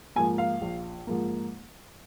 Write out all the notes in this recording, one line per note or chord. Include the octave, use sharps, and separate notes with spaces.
G#2 F3 A#3 G#5
F5
A#1
G#2 F3 A#3